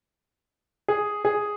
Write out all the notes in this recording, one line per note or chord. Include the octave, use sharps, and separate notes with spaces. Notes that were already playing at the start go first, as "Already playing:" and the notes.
G#4
G#4